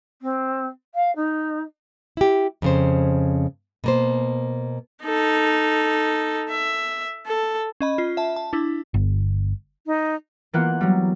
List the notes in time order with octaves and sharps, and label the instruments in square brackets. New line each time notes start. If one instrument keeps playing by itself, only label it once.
[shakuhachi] C4
F5
D#4
[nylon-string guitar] E4 G4
F2 C#3 C5
B2 A#3 C5
[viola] D#4 A4
E5
A4
[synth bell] C#4 D#5 B5
F4
E5 A5
A5
D4 E4
[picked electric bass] G1
[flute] D#4
[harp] E3 A#3 B3 F4 F#5
F#3 G3